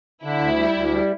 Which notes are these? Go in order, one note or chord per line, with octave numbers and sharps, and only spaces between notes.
D3 E4
D2
G3
D2
G3